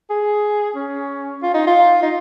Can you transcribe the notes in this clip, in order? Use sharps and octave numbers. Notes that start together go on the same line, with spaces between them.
G#4
C#4
F4
D#4
F4
D#4